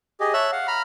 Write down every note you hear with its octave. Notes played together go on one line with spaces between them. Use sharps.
G4 G#4 D#5
C#5 E5 A5 E6 F#6
F5 F#5
A#5 B5 F6